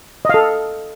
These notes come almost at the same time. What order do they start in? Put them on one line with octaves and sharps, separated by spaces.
D#5 F5 A4